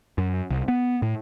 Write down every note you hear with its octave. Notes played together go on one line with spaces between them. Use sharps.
F#2
C2
B3
A2